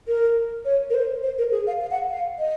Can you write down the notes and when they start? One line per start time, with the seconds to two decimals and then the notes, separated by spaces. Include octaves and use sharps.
0.08 A#4
0.65 C#5
0.90 A#4
0.94 C5
1.23 C5
1.38 A#4
1.52 G#4
1.67 F5
1.81 F5
1.91 F#5
2.10 F5
2.39 D#5